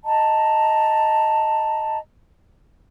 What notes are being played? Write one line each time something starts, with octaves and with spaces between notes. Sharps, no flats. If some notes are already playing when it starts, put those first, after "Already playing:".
D#5 A5 A#5